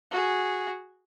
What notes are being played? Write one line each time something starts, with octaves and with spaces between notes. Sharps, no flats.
F#4 G#4